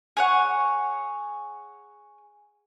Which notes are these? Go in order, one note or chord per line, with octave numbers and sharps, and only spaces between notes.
G#4 C#5 F#5